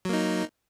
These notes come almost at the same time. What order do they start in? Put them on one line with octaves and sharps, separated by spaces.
F#3 A#3 D#4